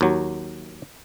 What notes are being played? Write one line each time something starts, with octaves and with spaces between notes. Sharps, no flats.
D#2 F#3